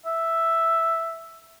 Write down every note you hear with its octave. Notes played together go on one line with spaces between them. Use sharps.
E5